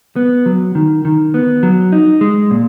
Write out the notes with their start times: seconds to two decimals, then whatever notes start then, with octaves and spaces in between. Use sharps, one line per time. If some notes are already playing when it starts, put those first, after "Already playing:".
0.16 B3
0.46 F#3
0.75 D#3
1.05 D#3
1.34 B3
1.63 F#3
1.92 D#4
2.21 G#3
2.51 A#2